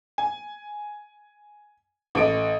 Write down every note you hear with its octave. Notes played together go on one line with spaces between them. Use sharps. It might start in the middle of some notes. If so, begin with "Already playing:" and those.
G#5
A1 A3 D#5 D#6 D7